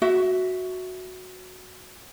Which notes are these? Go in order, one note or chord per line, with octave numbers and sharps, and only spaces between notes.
F#4 E5